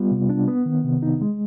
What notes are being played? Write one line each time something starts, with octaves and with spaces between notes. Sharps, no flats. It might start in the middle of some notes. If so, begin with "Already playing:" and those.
Already playing: G3 B3 F4
C3
D4
B3
D#3
C3
D#4
G#3